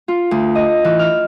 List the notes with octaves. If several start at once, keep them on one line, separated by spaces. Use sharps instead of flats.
F4
D2
D#5
E3
F6